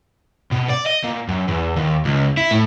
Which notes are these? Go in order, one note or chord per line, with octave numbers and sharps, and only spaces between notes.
B2
D5
D#5
A#2
F#2
E2
D#2
C#2
E4
A2